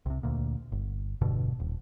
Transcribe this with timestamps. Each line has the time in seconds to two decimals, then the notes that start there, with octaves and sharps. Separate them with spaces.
0.06 C2 C3
0.23 D2 A#2
0.72 G1
1.21 E1 G2 B2 D3
1.60 D#1